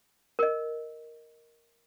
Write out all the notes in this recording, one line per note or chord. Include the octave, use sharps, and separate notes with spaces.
A#4 D#5